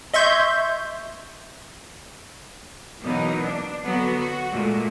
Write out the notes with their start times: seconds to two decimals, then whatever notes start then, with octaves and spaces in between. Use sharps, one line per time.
0.14 D#5 E5 C6 C#6 G6 G#6
3.03 B2 E3 F#3 A#3 B3 D#4
3.43 D4
3.82 D3 F#3 B3 F#4
4.17 F#4
4.50 A#2 G#3 A3